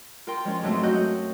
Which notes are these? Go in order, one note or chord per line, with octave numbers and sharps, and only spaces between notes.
F4 A#4 G5 C6
F3 G#3 C#4 F4
F2 G#2 F#3 G#3 A3 C4
F#2 F#4 D#5 F#6 G6